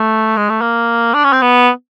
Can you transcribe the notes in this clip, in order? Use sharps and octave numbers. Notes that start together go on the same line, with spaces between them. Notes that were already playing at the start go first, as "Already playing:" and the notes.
Already playing: A3
G#3
A3
A#3
D4
C#4
C4
B3